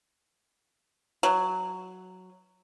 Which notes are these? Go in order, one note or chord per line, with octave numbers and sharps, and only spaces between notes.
F#3